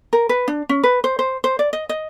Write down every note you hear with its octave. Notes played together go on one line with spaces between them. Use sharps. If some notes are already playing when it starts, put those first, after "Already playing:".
A#4
B4
D4
C#4
B4
C5
C5
C5
D5
D#5
D#5